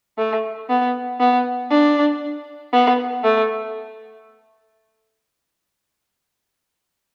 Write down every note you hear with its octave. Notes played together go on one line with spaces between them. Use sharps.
A3
B3
B3
D4
B3
A3